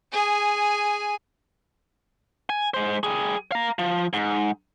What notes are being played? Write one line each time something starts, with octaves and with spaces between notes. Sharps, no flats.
G#4 G#5
G#5
G#3 C5
G3 G#4
F5 A#5
F3
G#2